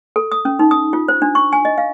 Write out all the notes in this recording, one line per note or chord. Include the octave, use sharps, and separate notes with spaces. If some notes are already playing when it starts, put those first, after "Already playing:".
A4
D#6
C#4
D#4
D#6
F4
C5
D4
C#6
G#5
D#5
F5